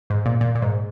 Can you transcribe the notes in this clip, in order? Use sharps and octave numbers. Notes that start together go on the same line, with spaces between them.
G#2
A#2
A#2
A#2
G#2